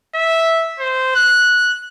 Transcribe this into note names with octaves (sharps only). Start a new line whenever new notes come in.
E5
C5
F#6